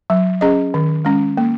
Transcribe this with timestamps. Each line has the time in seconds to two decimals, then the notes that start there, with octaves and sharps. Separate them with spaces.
0.10 F#3
0.41 C#4 G#4 D#5
0.74 D#3
1.05 G#3 C#4
1.37 A#3